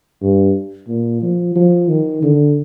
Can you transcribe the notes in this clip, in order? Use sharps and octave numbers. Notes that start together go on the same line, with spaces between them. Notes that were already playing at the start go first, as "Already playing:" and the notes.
G2
A#2
F3
F3
D#3
D3